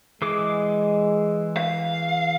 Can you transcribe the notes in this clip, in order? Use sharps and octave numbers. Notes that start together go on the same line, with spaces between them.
E3 G#3 G#4 D6
F5